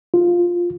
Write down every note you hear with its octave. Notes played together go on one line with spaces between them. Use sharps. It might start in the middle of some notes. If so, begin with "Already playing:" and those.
F4